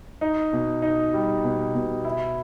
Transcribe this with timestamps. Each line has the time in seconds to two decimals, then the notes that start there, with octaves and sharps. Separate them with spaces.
0.21 D#4
0.53 B2
0.82 D#4
1.14 G3
1.44 B2
1.75 B2
2.05 E4